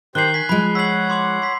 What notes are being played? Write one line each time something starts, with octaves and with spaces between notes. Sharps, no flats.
D#3 G4 C5 F#6 C7 F#7 G7
G#5 B6
F3 G#3 B5
C#5 F#5 E6 B6 C7 F#7
C6 D6 F#7
C6 B6